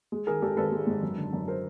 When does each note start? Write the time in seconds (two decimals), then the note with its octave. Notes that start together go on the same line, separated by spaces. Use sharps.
0.12 G#3
0.27 D#3 G#4 A#4
0.42 G#1 G4 A4
0.57 G#1 A4 B4
0.72 G#3
0.87 G#2
1.03 F#2
1.17 D3
1.33 F#2
1.48 A#4 C5